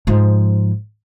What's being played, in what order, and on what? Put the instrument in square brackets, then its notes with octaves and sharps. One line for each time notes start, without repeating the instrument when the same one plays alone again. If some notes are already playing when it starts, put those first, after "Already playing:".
[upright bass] G#2 F3